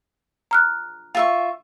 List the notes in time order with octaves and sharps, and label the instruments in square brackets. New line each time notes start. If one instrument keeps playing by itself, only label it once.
[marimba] A#5 F6 F#6
[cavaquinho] F4 E5 C#6